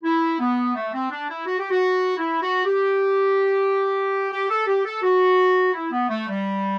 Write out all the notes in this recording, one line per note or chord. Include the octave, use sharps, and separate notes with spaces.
E4
B3
A3
C4
D4
E4
F#4
G4
F#4
E4
F#4
G4
G4
A4
G4
A4
F#4
E4
B3
A3
G3